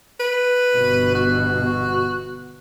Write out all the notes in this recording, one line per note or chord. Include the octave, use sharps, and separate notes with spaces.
B4
G1 B2
F#4